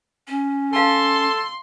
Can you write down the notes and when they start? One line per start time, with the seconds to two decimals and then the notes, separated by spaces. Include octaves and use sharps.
0.28 C#4
0.73 A4 F5 A5 C6